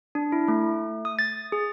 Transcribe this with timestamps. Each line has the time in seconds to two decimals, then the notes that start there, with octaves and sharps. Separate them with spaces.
0.15 D4
0.32 E4
0.48 A3
1.05 D#6
1.19 A6
1.52 G#4